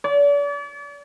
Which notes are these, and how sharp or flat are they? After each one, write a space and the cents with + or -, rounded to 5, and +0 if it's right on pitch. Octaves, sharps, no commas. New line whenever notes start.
D5 -40